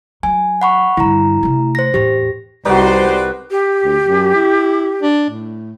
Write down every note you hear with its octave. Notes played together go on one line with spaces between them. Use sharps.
F#3 G#5
F#5 B5 C#6
G2 D3 E4 A#5
C3 A3
C5 A#6
E2 A2 G4 A#6
C2 D#4 F#4 G4 B4 C5 D5
G4
D2
F#2
E4
D4
A2